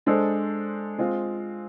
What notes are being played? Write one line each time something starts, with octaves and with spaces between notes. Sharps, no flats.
G#3 D4 A4 C5
G#3 C4 F4